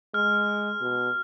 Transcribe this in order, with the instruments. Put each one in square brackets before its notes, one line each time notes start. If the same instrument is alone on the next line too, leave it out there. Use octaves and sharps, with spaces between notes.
[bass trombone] G#3 [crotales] F6
[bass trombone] B2